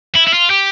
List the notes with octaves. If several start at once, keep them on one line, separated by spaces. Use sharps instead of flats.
E4
E4
F4
G4